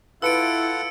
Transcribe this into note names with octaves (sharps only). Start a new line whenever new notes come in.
E4 F4 A4 B4 F#5 E6 C#7 D7